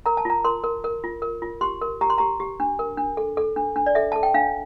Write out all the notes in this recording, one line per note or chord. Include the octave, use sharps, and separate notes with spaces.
A#4 A#5
A5
F4 A#5
A#4 C6
A#4
A#4
F4
A#4
F4
G4 C6
A#4
G4 A#5
C6
G4 A#5
G4
D4
A#4
D4
A4
A4
D4
D4
D5
A4 E5
A4 A5
G5
D4 F5